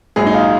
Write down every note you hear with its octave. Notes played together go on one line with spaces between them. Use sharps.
A#1 G#2 F#3 G#4
D#4
F4